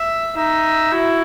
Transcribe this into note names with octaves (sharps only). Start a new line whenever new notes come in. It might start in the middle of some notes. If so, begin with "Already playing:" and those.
Already playing: E5
D#4 E5
E4 F#4